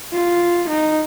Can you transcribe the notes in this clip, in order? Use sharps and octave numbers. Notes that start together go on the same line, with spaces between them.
F4
D#4